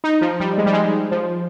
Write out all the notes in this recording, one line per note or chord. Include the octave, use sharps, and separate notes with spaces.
D#4
F3
G3
G#3
G3
G#3
F3